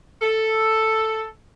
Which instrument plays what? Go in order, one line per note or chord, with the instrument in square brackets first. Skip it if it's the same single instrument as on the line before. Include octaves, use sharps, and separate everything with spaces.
[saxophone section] A4